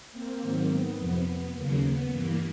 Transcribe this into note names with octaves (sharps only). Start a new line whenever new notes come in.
A#3 C4
G#2 D#3 F#3
B3
F2 C3 F3
D#2 C#3 F#3 A#3
B3
G2 E3 G3 A#3